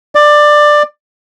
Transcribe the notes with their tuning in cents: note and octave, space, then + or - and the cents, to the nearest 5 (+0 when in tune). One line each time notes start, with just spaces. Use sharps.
D5 +15